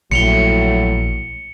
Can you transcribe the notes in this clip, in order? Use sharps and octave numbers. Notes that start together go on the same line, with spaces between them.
A#1 A2 F#3 C#7 F7 G7